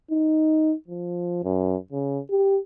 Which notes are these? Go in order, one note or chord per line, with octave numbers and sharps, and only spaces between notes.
D#4
F3
F#2
C#3
G4